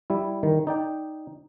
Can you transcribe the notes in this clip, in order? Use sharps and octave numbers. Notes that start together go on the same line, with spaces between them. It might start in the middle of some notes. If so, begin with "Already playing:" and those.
G3 E4
D#3
D#4 D5 G5